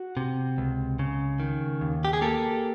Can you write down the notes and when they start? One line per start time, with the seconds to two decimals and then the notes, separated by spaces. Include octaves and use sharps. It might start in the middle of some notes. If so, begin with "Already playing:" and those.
Already playing: F#4
0.17 C3
0.58 C#2
0.99 C#3
1.40 D#3
1.81 D#2
2.05 G4
2.13 G#4
2.21 A#3 G4 A4